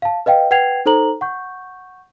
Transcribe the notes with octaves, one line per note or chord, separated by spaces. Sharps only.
F5 A5
B4 D#5 F5 G5
B4 F#5 G5 G#6 C7 F7
D#4 A4 C5 A#5 F#7
F#5 C#6 G6